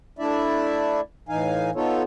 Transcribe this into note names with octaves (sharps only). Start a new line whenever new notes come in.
A3 D4 E4 D5 E5
A2 E3 D#4 F5 G#5
B3 D#4 F4 A4 C#5